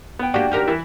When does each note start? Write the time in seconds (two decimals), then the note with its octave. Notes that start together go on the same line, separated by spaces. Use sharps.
0.19 B3 G5
0.34 A#3 D4 F#4 G4
0.52 D#2 G4 A#4
0.68 E3 E4